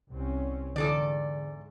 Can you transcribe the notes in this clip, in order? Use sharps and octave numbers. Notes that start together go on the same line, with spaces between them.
C2 C4 C#4
E2 G#2 D3 A4 D5